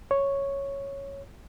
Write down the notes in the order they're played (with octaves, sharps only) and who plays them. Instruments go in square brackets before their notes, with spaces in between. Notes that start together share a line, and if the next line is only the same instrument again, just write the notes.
[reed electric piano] C#5